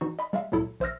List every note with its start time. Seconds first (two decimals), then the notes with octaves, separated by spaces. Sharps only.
0.01 E3 D#4 F#4
0.19 D#5 B5
0.33 G3 G#3 E5 F5
0.52 C#2 A#2 F#3 E4 A4
0.80 A#1 C5 E5 E6 F6 A#6